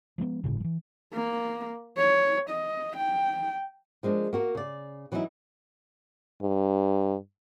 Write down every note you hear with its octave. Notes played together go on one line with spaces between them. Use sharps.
F3 G#3 A#3 B3
G1 A2 C#3
E3 F3
A#3
C#5
D#5
G5
F3 G#3 A#3 D4
A#3 F#4 A#4
C#3 D5
E3 F#3 C#4 D#4 E4
G2